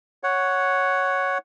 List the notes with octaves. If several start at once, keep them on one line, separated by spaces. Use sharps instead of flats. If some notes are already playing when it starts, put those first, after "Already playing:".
C#5 F#5